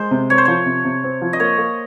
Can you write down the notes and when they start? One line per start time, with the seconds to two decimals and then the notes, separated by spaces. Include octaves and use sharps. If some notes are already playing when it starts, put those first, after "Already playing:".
Already playing: G#3 C5
0.11 C3
0.30 C4 C#5
0.38 C5
0.45 F3 C#5
0.66 C3
0.85 C3
1.04 C4
1.22 F3
1.33 D#5
1.40 A#3 C#5
1.58 A#3